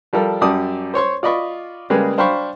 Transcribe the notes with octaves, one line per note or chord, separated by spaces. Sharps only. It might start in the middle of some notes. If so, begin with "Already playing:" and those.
F3 G3 F4 A4 A#4
F#2 G3 D5 A5 D6 D#6
C5 C#5 C6 C#6
F4 D5 D#5 B5 C#6 D6
C#3 G3 G#3 A#3 G#4 B4
D4 C5 F5 G5 B5 C#6